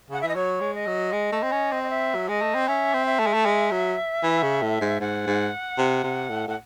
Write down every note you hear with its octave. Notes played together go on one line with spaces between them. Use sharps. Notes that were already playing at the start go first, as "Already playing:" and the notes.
C#3 F#5
E5
E3 D#5
F#3 C#5
G#3
D#5
F#3
G#3
A3
C4
C#4
C4
D#5
E5
F#3
G#3 D#5
A3
C4
C#4 E5
C4
E5
A3
G#3
A3
G#3
F#3
E3
C#3
A2
G#2
G#2 F#5
G#2
C3
C3
A2
A2 F#5